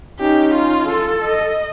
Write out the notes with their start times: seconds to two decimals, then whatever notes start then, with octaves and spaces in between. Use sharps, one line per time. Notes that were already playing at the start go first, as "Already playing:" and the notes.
0.20 C#4 D#4 G4
0.54 F4
0.87 A4
1.24 D#5